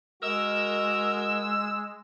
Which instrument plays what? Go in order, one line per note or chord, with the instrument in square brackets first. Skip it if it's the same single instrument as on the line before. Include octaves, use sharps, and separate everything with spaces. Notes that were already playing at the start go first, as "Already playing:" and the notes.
[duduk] G#3 [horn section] F#4 A#4 D#5 [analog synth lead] E6